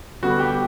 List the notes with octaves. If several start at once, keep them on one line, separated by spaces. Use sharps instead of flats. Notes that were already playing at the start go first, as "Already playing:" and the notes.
D3 G3 B3 F#4
G4